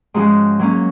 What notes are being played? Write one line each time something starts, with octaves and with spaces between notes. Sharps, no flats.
G#2 F3 G#3 C#4 F#4
F#3 A#3 C#4